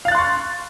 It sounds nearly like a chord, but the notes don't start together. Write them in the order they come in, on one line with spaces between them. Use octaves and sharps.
F5 A6 F#6 C6 C#6